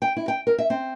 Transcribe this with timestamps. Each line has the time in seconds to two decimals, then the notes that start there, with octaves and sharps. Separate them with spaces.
0.02 G5
0.17 E4
0.28 G5
0.47 A#4
0.58 E5
0.70 C4